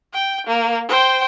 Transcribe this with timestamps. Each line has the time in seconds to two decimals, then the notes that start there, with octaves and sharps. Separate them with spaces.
0.13 G5
0.46 A#3
0.88 C5 G5